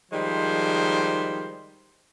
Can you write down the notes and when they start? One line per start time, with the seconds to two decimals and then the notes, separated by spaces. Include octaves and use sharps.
0.12 D#3 F3 G3 G#3 C5